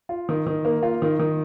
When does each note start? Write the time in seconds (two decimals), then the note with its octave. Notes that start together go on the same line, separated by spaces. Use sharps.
0.09 F4
0.29 D#3
0.47 D#3
0.65 A#3
0.83 F4
1.02 D#3
1.19 D#3